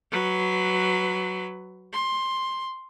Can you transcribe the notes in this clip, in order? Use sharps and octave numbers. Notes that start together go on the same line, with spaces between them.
F#3 B4
C6